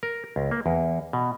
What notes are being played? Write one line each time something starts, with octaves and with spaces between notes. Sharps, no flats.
A#4
C#2
A#3
E2
B2